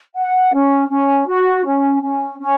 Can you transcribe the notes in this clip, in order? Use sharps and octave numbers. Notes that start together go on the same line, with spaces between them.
F#5
C#4
C#4
F#4
C#4
C#4
C#4